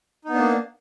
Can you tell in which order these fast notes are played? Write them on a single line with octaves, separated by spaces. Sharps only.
D#4 B3 D4 A#3